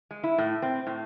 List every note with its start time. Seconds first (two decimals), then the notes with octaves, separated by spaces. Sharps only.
0.11 G#3
0.24 E4
0.38 A2
0.62 C4
0.87 A2